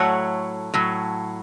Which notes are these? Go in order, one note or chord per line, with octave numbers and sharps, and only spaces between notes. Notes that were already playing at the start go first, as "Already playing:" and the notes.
Already playing: A2 F#3 A3 C#5 F#5
A2 F#3